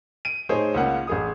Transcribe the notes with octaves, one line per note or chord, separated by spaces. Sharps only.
D7 D#7
A2 D#4 G#4 C5 C#5
C#2 C#3 A#3 C#4 F#5
A1 G#4 D#6